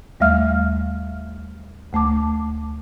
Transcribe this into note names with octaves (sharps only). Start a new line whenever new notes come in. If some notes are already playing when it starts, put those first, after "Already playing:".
D#2 G3 A3 E5 F5 F6
D2 A3 A5 D6